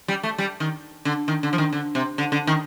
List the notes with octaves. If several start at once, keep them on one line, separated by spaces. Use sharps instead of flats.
G3
A3
G3
D#3
D3
D#3
D3
F3
D#3
D3
C3
D3
D3
D#3